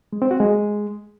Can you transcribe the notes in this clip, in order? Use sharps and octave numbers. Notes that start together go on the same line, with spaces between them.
G#3
C4
F#4
G#3